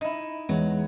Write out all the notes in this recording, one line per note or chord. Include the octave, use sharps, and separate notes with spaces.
D#4 E4
E2 F#3 G#3